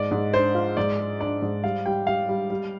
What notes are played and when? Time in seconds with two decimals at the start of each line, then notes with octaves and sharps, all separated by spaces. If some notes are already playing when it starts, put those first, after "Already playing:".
Already playing: G#2 D5 D#5
0.11 G#2
0.33 D4 C5
0.55 F4
0.77 G#2 D5
0.99 G#3
1.20 D4 D5
1.42 G#2
1.64 G3 F5
1.86 G3 G5
2.07 G3 F5
2.29 G3
2.50 G3